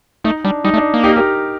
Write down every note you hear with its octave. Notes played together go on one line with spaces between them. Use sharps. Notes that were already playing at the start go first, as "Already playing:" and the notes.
A3 D#4
G3 D4
G3 D#4
A3
D4
A#3
D#4 G4
G4 A#4